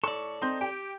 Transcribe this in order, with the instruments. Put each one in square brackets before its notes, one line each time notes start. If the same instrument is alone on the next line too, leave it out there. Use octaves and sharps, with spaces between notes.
[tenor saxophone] A2 [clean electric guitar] A4 D5 [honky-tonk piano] C#6
[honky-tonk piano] C4 C6 G6 [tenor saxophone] D#4
[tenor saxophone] G4 [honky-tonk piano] G5